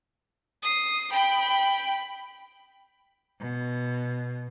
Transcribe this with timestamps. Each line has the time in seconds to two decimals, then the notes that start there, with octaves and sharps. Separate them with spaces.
0.62 D#6 C7
1.12 G5 B5
3.41 B2